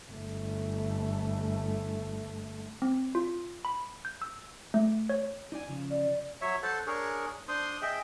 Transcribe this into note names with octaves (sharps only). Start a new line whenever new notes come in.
G1 A3
C4
F4
B5
G6
E6
A3
C#5
D#4 D5 G#5
C#3 F3
D5
F#3 C#5 E5
A4 C5 F#5 A5
D4 G#4 A#4 C#5
D4 C5 C6 D#6
G#4 D#5 E5 G5